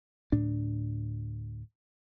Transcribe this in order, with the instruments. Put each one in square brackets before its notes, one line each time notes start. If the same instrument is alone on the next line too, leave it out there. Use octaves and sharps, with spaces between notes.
[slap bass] D2 A2 D4